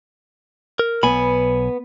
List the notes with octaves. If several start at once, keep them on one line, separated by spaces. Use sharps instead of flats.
A#4
B1 B3 G#5 B5